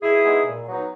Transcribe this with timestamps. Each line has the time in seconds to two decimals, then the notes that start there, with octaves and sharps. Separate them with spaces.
0.02 B2 E4 G#4
0.24 G#3 B3 D#4
0.46 A#2
0.68 F#3 B3 D#4